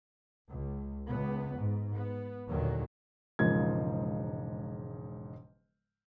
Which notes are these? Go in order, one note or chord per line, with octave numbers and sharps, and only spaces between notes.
C#2
C#2 B3
G#2
B3
D#2 A#2 D3 D#3 F#3
E1 G#2 C#3 F3 A#3 G#6